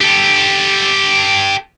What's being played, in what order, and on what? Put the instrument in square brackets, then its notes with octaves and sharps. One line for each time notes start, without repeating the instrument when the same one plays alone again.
[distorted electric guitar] G4 A4